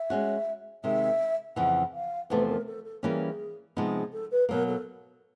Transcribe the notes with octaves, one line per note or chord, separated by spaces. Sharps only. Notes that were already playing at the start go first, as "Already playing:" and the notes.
Already playing: E5
G#3 C#4 F#4
C3 D#3 G#3 E5
F2 C#3 E3 F#5
F5
E2 C3 F3 A3 B4
A#4
A4
A4
E3 G3 A#3 C#4 G#4
C3 F3 G#3 B3 D#4 G#4
A4
B4
B2 F#3 A#3 A#4
A4